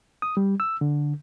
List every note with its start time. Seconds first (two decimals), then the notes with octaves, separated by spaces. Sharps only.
0.22 D#6
0.37 G3
0.60 E6
0.81 D3